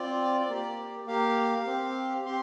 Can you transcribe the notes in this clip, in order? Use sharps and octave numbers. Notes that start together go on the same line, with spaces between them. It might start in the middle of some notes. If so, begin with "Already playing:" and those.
Already playing: C4 F4 D5
A#3 G4
A#3 G4 F5
C4 G4
C4 G4 C6